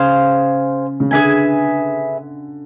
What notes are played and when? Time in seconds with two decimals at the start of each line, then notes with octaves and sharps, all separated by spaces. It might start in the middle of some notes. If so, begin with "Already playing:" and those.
Already playing: C#3 G#4 C5 F5
1.00 C#3
1.11 D3 G#4 B4 E5 G#5